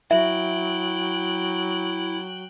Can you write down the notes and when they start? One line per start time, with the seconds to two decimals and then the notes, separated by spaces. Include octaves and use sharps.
0.11 F#3 E4 E5 G5 F#6